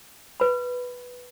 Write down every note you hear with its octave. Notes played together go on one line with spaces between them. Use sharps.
B4 B5